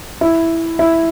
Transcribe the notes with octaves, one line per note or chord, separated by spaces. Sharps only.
E4
E4